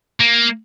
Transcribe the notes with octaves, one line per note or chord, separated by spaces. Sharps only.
A#3